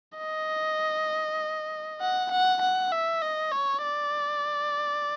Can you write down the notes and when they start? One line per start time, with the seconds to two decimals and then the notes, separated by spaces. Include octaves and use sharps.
0.18 D#5
2.01 F#5
2.31 F#5
2.61 F#5
2.92 E5
3.22 D#5
3.52 C#5
3.83 D5